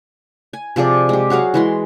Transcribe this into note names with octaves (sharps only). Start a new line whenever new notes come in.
G#5
C3 F3 G#4 D5
G#3 G4
F#3 F#4 G#4 F5
E3 G#3 C6